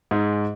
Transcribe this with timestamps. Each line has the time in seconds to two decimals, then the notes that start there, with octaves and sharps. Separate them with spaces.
0.11 G#2